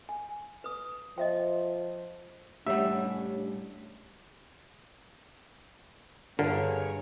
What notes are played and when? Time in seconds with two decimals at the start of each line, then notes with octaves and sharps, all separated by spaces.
0.09 G#5
0.64 B4 D#6
1.18 F3 D#5 E5 G5
2.66 A2 G3 C#4 D4 G4 C#5 E5 F#5
6.39 G2 D3 G#4 A#4 C#5